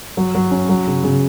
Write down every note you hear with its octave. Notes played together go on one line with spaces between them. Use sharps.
F#3
F#3
C#4
F#3
C#3
C#3